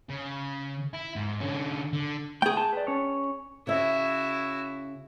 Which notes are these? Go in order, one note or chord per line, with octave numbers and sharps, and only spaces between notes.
C#3
E4
G#2
D3 C#4
D3
A3 G#4 G5
A5
B4 D5
C#4 C#5
C#3 E4 F#4 E5